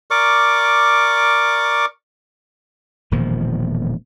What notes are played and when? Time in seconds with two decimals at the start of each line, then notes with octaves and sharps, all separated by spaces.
0.11 A#4 D5 C#6 D6
3.11 E1 A#2 D#3 F3